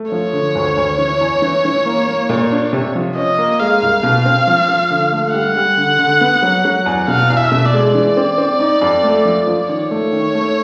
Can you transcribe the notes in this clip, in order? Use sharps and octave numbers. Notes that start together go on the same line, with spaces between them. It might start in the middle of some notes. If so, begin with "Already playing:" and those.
Already playing: A3
F3 C#5
D3
D2
D2
E3
E2
E3
E3
A#3
A#3
A#2
D4
C3
F3
C#4 D#5
A#3
G#3 F5
C2
B2
C4
F3
F3
D3
A3
G3 F#5
G3
D3
D3
B3
F#3
F#3
E2
B2 F5
E2
E5
B2
D5
G#3
E3 D5
C4
C4
D#4
F2
A3
F3
F3
D#3 C#5
A3
D#3
A3